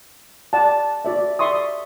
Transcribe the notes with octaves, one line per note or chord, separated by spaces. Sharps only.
D5 F#5 G5 A5
F#4 D5 E5
D5 E5 C6 C#6 D#6